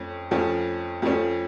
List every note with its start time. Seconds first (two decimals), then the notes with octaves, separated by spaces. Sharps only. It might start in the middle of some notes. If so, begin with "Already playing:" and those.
Already playing: F2 A3 C#4
0.31 F2 F3 A3 C#4
1.02 F2 F3 A3 C#4